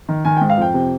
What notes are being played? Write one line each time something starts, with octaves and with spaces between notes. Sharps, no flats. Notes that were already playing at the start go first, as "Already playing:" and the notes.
D#3
D#3 G#5
G#2 G5
F5
F2 G5
C3